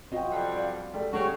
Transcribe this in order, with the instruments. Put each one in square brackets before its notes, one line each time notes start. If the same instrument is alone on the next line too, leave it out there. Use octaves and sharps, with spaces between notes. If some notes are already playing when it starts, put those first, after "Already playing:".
[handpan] C4 F4 F#4 [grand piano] D#5 G5
[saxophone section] F2 G3
[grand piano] D5 F5
G3 A3
[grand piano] G2 A3 [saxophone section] C#3 F#4 [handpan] G3 G4 C#5